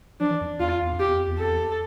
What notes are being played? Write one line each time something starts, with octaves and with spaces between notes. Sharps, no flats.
F3 D4
E3
F2
E2 F4
F2
E2
F2
G4
E2
F2
E2
F2 A4
E2